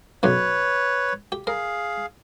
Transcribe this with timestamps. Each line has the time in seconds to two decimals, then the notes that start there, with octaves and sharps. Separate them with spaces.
0.23 B1 F#2 B2 B4 C#5
1.32 G4
1.47 G#4 A#4 F5